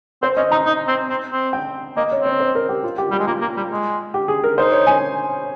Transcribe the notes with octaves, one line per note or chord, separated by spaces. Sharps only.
C4 C5
C#4 D#5
D#4 A#5
D#4
C4
C4
C4
G5
A#3 D#5
C#5
C4
C#5
C5
A#4
G4
F4
G4
G3 G4
G#3
A#3 F4
A#3
G3
G#3
G4
G#4
A#4
D#4 C5
C#5
G#5